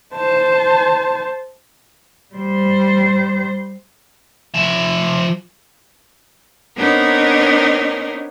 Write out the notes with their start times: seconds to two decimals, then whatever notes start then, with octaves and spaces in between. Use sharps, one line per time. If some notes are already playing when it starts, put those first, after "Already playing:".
0.15 C5 A5
2.35 G3 C5
4.54 F3 E5
6.77 B3 C4 D4 D#4 A#4 C#5